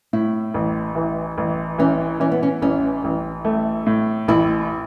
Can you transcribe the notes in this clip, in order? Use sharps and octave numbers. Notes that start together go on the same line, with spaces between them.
A2 E4
A1
E3
A1
E3 C#4
E3 C#4
B3
C#4
A1 C#4
A1
A3
A2
A1 E4